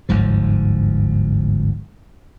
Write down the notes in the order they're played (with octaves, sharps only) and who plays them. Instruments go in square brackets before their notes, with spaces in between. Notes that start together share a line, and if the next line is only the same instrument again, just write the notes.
[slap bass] G1 D2 G#2 F3